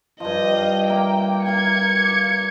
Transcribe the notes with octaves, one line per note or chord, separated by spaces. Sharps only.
G2 F3 D#5
G2 F5
A#3 E5 G5
A#3 F5 G#6 C#7
D6